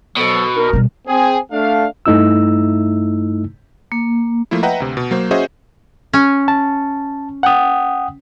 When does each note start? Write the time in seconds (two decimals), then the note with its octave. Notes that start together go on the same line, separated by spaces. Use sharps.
0.17 B2 F3 F#3 A4
0.55 D4 D#4 A#4
0.73 B2 G3
1.08 C4 G#4
1.52 A3 D4 F5
2.06 G2 A3 D#4 E4 E6
3.92 A#3
4.51 F3 A3 A#3 E4
4.63 B4 D#5 E5 F#5 G5 A#5
4.80 D2 C3
4.97 B2
5.11 F#3 A#3 C5
5.31 C#4 F#4 G#4 C5 D#5 E5
6.13 C#4
6.48 A5
7.43 F#5 G5 D#6